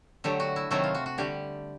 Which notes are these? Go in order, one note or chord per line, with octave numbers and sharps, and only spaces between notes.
D3 F#3 A3 G4
F#4
E4
C3 D#3 F#3 A3 E4
F4
F#4
F#4
D3 G3 G4